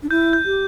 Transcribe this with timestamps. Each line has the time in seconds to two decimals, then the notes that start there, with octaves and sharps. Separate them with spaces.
0.03 D4
0.10 E4 G6
0.33 G6
0.46 G4